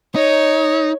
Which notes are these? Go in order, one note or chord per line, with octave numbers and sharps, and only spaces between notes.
D#4 C#5